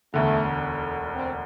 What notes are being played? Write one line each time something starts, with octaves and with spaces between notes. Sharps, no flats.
E1 D2 D3 A3
C4